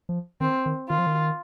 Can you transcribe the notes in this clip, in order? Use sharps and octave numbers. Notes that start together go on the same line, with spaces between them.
F3
D#3 C4
D#3
D#3 F4
F3
D#3